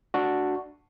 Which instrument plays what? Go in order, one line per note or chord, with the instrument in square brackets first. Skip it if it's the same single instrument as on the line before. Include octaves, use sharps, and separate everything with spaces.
[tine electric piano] D4 F#4